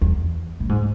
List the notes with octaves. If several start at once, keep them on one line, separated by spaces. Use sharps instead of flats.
E2
A2
G#2